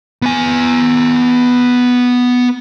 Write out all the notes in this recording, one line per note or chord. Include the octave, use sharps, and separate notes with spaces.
B3 G#5